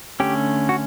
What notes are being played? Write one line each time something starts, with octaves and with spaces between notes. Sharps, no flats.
D3 A3 C#4 G4
F#4